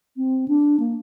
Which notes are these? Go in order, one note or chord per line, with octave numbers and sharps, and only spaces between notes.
C4
D4
A#3